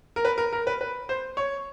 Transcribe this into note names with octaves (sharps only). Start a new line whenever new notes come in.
A#4
B4
A#4
A#4
B4
B4
C5
C#5